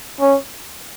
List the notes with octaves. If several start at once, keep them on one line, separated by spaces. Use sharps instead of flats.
C#4